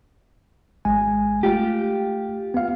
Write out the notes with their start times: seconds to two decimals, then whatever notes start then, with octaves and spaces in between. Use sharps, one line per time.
0.85 G#1 G#3 G#5
1.43 A3 F4 G4
2.54 B3 F5